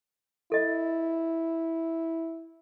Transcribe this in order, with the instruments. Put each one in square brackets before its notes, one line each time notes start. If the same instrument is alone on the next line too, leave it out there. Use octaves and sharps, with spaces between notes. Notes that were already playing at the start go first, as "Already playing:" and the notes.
[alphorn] E4 [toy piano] A4 D#5